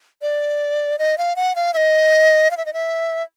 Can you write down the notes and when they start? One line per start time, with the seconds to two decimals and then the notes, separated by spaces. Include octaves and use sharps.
0.22 D5
0.99 D#5
1.18 F5
1.36 F#5
1.56 F5
1.74 E5
1.77 D#5
2.51 F5
2.57 E5
2.66 D#5
2.73 E5